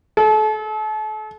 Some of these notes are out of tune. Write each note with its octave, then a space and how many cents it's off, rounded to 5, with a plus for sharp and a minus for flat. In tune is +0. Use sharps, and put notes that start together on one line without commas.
A4 -35